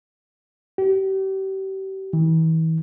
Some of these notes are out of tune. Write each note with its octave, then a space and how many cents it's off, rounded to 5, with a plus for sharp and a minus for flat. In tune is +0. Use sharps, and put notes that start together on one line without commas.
G4 -35
E3 -40